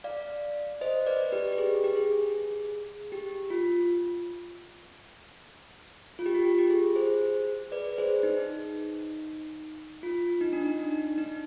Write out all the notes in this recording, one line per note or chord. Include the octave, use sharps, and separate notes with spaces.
D5 F5
C5 D#5
B4 D5
G4 B4
G4
G#4
G4
G#4
G4
F4
F4
G4
F4
G4
G4
G#4
G#4 C5
B4 D5
G#4 C5
D#4
F4
D#4
D4
D#4
D4
D#4